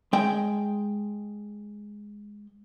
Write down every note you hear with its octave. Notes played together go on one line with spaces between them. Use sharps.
G#3 G5